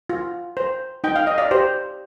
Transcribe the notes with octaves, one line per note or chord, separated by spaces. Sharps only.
F4
C5
D#4 G5
F5
D#5
D5 F5
G4 C5